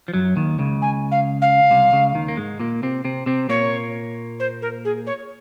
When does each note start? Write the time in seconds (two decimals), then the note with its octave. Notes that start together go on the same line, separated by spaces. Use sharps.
0.08 F3
0.14 F#2 F#3
0.36 D#2 D#3
0.59 C#2 C#3
0.81 G#5
1.11 F5
1.41 F5
1.71 C2 C3
1.92 C#2 C#3
2.15 D#2 D#3
2.28 A#3
2.37 G#2 G#3
2.59 A#2 A#3
2.83 C3 C4
3.05 C3 C4
3.26 C3 C4
3.49 A#2 A#3 C#5
4.39 C5
4.61 A#4
4.84 G#4
5.06 C#5